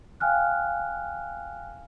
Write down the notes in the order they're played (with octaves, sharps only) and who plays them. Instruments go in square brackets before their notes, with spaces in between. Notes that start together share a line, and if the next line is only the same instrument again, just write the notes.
[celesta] F5 G5 G#5 F6 F#6